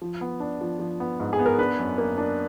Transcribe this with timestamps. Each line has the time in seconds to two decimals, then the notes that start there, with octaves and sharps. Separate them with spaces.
0.02 F3
0.21 B3
0.40 D4
0.61 F3
0.79 F3
1.00 B3
1.20 G#2
1.33 G#4
1.39 B3
1.46 A#4
1.58 D4 B4
1.79 F#2
1.98 A#3
2.18 D4